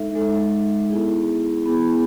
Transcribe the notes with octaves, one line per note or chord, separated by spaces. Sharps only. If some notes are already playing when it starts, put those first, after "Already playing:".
Already playing: G#3 D#4 A4 E5
G#3 D#4 A4 E5
B3 E4 G#4
B3 E4 G#4